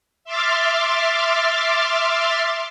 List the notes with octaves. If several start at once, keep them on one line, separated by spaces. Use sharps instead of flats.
E5 C6 D6 F6 A6